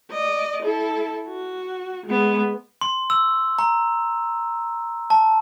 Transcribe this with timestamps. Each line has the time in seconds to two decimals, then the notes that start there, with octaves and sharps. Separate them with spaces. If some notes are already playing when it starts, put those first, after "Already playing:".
0.11 D5 D#5
0.63 E4 A4
1.27 F#4
2.07 G#3 B3
2.81 C6
3.10 E6
3.59 A#5
5.10 A5